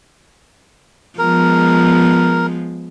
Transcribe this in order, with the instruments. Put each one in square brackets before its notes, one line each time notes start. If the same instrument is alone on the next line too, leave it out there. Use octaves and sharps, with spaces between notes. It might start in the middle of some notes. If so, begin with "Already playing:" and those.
[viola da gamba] F3 G#3 B3 [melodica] A#4